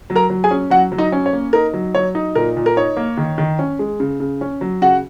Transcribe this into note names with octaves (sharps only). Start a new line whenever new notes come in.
F#3
A#4 A#5
F#3
G#4 G#5
C#4
F#3 F#4 F#5
F#3
D#4 D#5
C#4
C#5
A#3
D#4 A#4
F#3
F#3 C#5
D#4
A#2 A#4
A#2
A#4
D#4 C#5
A#3
D#3
D#3
C#4
G#3
C#3
C#3
C#4
F#3
C#3 F#4 F#5